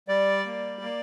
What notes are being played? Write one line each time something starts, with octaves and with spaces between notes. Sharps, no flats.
G3 D5
A#3
A#3